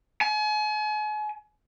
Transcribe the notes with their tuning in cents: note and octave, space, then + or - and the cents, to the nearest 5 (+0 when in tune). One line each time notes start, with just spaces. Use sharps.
G#5 +40